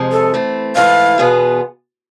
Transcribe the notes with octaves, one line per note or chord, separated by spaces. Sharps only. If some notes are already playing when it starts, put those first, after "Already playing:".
Already playing: F2 C3 F3 G#3
A4
E3 A3 C4
G#2 E3 A3 E4 F5
E2 B2 B3 F4 G#4